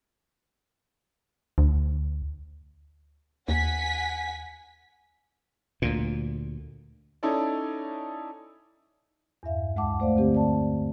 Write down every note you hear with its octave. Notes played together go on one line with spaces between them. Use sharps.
D2
D#2 F#5 G#5 B6
D2 A#2
C#4 D#4 E4 A4 D5
E2 G2 E5 F5
D2 G#3 F#5 A5 D6
A3 C5 D5 F5
D3 C4 G4
D5 A5